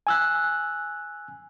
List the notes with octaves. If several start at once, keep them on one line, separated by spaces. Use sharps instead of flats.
G#5 E6 F#6